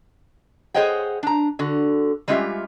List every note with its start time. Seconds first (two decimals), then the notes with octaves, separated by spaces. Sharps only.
0.74 G#4 C5 C#5 D#5 F#5 G5
1.23 D4 A#5
1.59 D3 F#4
2.28 G3 G#3 C#4 F4 G4 E5